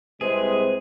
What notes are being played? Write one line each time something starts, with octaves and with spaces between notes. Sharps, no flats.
C2 C3 G#3 G#4 B4 C5